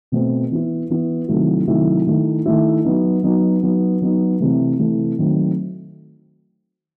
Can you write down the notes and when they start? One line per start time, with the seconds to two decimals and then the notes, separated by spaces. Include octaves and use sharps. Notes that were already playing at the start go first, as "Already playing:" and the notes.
0.12 B2 A3 C4
0.50 E3 B3 E4
0.90 E3 B3 E4
1.28 C3 D#3 F#3 A3 E4
1.68 C3 D#3 F#3 A3 E4
2.07 D#3 A3 E4
2.46 D#3 A3 E4
2.84 F#3 B3 D#4
3.23 F#3 B3 D#4
3.63 F#3 B3 D#4
4.02 F#3 B3 D#4
4.40 C3 E3 A3
4.80 C3 E3 A3
5.18 D#3 F#3 A3 C4